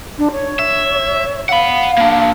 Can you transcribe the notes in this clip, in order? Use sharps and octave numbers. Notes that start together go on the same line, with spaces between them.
D4
C#5
E5
F5 F#5 B5
A#3 D4